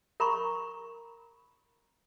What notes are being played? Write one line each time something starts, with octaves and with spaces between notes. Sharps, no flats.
A#4 A#5 B5 C#6